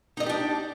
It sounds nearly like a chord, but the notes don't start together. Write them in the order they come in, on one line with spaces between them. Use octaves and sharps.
D#4 D#5 D5 G4 D4